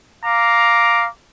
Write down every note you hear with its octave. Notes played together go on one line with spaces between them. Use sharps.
F5 A#5 D6